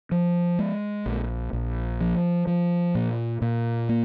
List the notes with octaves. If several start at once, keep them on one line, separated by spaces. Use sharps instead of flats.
F3
G#3
A#1
A#1
F3
F3
A#2
A#2
A#3